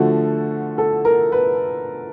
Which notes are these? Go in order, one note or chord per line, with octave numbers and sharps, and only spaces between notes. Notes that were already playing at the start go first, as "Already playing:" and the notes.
Already playing: D3 F3 A3 F#4
A4
A#4
B4